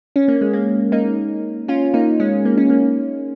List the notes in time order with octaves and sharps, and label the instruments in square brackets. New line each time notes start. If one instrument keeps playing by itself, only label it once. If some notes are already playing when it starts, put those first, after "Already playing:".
[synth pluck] C#4
A#3
G#3
A#3
A#3 D#4
C#4 F4
A#3 D#4
G#3 C#4
A#3
C#4
A#3